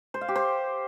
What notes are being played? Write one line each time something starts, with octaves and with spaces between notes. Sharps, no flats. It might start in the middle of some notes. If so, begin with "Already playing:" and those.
C5
F5
G4
C5